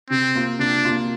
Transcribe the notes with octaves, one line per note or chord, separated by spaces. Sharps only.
C3 C4
A#3 F4
C3 D4
A#3 F4